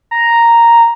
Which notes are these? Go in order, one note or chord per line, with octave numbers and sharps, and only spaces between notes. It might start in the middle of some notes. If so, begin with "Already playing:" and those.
A#5